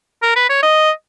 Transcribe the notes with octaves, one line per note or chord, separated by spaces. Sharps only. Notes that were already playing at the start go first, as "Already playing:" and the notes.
A#4
B4
C#5
D#5